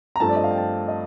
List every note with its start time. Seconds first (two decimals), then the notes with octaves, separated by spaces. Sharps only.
0.16 A#5
0.20 G2 F3 A3 C4 A5
0.29 D5
0.36 D#5
0.44 F5
0.51 G5
0.58 A5
0.88 D#5